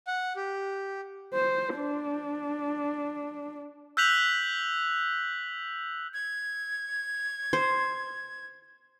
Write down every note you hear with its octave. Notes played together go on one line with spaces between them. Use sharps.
F#5
G4
C5
D4
E6 F#6 G6 B6 F7 F#7
G#6
C5